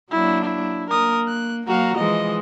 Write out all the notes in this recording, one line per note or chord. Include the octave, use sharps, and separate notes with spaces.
F#3 A#3 D4 E4
E4
A#3 A#4 D#6
F#6
F#3 A#3 F#4 F5 A#5
E3 F3 G#3 D#5